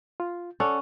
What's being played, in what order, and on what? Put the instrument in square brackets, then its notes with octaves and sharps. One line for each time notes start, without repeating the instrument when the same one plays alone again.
[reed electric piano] F4
[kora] C#4 [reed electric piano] A4 D5 F#5